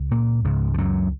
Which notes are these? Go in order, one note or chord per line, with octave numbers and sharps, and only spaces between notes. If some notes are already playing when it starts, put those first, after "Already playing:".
Already playing: C#2
A#2 A#3
C#2 G#2 C#3 G#3
F3
F#2 F#3